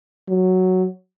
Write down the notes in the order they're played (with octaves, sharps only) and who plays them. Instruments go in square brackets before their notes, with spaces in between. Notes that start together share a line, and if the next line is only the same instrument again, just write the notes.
[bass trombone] F#3